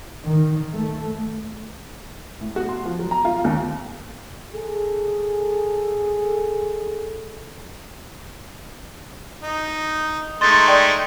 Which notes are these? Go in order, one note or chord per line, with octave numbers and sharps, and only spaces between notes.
D#3
A3
A2
F#4
C6
F3
F#3
A#5
F4
D#2
G#4 A4
D#4
G#3 A3 D#4 C6 A6
D5 G5